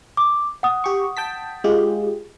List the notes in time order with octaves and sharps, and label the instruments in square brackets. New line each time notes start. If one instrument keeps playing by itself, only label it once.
[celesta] D6
F#5 D#6
[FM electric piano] G4 C#6
G5 A5 B6
G#3 F4 G4